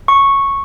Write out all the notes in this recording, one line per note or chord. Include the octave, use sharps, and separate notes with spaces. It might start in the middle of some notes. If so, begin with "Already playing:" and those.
C#6